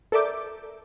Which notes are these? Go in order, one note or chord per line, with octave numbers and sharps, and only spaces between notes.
A4 A#4 D5 E5 D6 G6